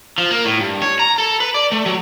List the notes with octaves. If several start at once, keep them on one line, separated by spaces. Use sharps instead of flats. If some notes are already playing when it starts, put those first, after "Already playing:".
F3
A#3
A2
G2
C#5
A#5
A4
B4
D5
A3
F#3